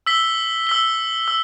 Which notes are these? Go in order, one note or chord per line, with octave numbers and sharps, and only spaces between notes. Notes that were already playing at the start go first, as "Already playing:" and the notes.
E6 B6 G7
E6 B6 G7
E6